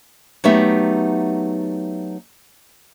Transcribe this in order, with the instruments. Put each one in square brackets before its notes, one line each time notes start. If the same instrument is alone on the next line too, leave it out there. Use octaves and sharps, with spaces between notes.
[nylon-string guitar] F#3 A3 B3 D#4 G4 E5